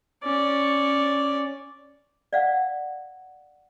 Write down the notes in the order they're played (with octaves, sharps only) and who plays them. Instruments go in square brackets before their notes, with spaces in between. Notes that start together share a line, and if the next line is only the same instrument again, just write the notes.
[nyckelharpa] C#4 D5
[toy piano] D5 F5 F#5